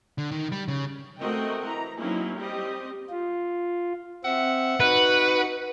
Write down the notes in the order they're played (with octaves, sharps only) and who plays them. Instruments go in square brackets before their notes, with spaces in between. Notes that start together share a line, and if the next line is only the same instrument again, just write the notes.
[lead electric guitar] D3
D#3
G3
C#3
[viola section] A3 C4 F#4 A#4 D#5 G5
E3 A#5
F#3 A#3 C4 C#4 D#4 E4
G3 C4 G4 D#5
[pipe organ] F4
[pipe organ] C4 E5 [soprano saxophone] F#5
[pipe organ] D#4 F#4 [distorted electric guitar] B4